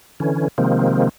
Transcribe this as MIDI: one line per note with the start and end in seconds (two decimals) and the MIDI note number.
0.20 0.48 50
0.20 0.48 52
0.20 0.48 61
0.58 1.09 48
0.58 1.09 51
0.58 1.09 53
0.58 1.09 56
0.58 1.09 58
0.58 1.09 60